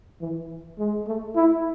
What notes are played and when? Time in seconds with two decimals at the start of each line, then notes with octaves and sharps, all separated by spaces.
0.21 E3
0.79 G#3
1.07 A3
1.36 E4